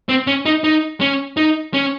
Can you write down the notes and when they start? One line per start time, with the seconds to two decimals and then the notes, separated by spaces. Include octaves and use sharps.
0.09 C4
0.27 C#4
0.46 D#4
0.64 D#4
1.01 C#4
1.37 D#4
1.74 C#4